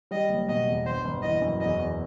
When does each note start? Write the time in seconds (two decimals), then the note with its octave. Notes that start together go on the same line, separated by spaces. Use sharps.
0.11 G3 D#5
0.29 F#1
0.48 B2 D#5
0.67 E2
0.86 G1 C5
1.05 G1
1.23 E3 D#5
1.42 F#2
1.61 E2 D#5
1.79 E2